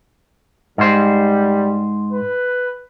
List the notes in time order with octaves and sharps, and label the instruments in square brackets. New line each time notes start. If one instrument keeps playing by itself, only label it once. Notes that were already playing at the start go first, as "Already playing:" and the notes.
[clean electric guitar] G#2 C5 [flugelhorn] G3
[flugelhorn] B4